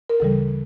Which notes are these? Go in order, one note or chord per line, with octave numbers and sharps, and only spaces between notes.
A#4
D2 C#3 E3 G3 A4